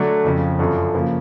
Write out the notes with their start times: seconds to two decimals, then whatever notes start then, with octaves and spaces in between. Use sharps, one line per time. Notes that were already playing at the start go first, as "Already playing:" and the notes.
Already playing: D3 F#3 A3 D4 F#4
0.24 F2 C#3 F3
0.59 F#2 D3 F3
0.94 C#3 F3 A#3